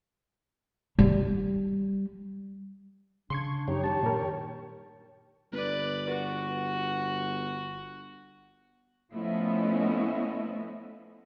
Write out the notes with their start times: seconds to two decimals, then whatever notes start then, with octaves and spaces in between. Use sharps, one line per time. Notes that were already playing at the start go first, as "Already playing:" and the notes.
0.99 G3
3.30 C#3 D4 C6 C#6 G#6
3.68 F#2 D#4 G4 C#5
3.83 D#3 G3 D4 A5
4.03 A#2 A#4
5.52 G1 B4 D5
6.09 F#4
9.13 F3 A3 B3 C#4 E4 D#5